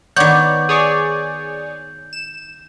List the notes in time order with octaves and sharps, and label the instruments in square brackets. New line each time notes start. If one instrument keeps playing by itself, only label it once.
[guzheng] D#3 B3 [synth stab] C#5 D5 [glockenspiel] G6
[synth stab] G#4 C#5 D5
E7